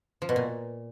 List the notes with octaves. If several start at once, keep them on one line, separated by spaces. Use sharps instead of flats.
F3
B2
A#2